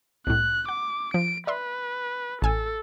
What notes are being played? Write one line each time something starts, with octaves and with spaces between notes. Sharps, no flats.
C2 A2 F#6
F#5 D6
F3 D7
B4 D5 E5 C6
A1 A4 G#5 E6